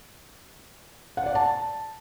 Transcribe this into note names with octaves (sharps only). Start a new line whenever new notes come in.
F#5
D5
A5